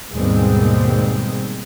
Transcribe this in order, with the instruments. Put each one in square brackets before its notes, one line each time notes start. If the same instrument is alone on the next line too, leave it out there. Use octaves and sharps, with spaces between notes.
[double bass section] D#2 G#2 B2 G3 G#3 C4